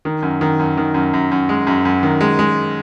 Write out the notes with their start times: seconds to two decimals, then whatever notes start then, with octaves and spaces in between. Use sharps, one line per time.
0.05 D#3
0.23 F#2
0.41 D#3
0.59 F#2
0.77 D#3
0.94 F#2
1.14 F#2
1.32 F#2
1.49 G#3
1.67 F#2
1.85 F#2
2.03 D#3
2.21 G#3
2.39 G#3